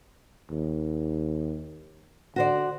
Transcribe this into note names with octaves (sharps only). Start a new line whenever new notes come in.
D#2
D3 F#4 C5 D5